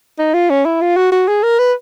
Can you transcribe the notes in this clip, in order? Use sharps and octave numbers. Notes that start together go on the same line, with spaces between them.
D#4
F4
C#4
E4
F4
F#4
F#4
G#4
A#4
B4